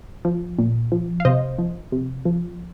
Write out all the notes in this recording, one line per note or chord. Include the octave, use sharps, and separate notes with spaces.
F3
A#2
F3
F5
C3 C5 D#5
F3
C3
F3